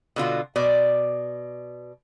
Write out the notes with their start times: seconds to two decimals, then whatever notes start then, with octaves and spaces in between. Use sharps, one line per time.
0.16 B2 D3 F4 F#4
0.56 B2 D5